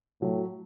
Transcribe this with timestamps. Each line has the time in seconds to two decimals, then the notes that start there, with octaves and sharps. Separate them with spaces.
0.21 A2 F#3